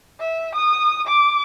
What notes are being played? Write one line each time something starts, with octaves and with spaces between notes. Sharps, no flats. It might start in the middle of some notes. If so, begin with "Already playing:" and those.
E5
D#6
D6